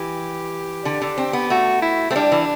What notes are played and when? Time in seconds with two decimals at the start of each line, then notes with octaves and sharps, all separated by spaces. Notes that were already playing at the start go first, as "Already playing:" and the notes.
Already playing: E3 G4
0.85 D3
1.02 D3
1.18 C4
1.33 B3
1.50 A3 F#4
1.82 E4
2.11 A3 C4
2.16 G3 D4
2.32 E3